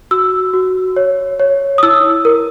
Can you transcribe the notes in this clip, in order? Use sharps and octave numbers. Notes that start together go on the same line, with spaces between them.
F#4 E6
F#4
C#5
C#5
D#6
E4 E6
A#4